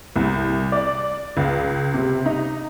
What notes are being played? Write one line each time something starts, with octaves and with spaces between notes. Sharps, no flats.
C2
D5
C#2
C3
D#4